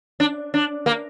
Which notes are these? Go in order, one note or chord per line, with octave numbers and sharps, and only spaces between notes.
D4
D4
A#3